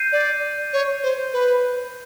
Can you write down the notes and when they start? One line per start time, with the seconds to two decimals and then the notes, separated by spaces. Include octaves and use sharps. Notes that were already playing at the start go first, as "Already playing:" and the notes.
Already playing: G6 C7 D#7
0.12 D5
0.73 C#5
1.03 C5
1.33 B4